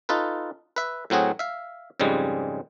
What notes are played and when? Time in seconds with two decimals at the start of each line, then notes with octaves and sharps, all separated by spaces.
0.09 D#4 F4 A4 B4
0.76 B4 E5
1.10 A2 F#3 C4 F#4 G#4
1.39 E5 F5
2.00 F2 G#2 C#3 G3 G#3